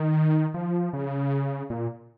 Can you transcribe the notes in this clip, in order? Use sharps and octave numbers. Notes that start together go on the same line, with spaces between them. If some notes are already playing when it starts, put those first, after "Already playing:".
Already playing: D#3
F3
C#3
A#2